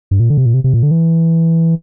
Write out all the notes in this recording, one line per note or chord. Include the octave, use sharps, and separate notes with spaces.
G2
A#2
D3
C3
A#2
C3
C3
A#2
D3
E3